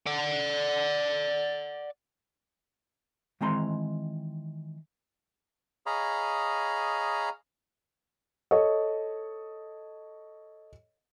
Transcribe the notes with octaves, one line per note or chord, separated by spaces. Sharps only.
D5 F#5
D#3 E3 G#3 C4 A#5 C6
G#4 C#5 D#5 F5 A#5 B5
A4 C#5 D#5